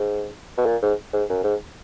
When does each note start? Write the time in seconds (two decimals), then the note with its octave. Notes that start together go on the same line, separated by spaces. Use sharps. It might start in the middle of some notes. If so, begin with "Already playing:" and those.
Already playing: G#2
0.58 B2
0.66 A#2
0.82 G#2
1.13 G#2
1.29 F#2
1.44 G#2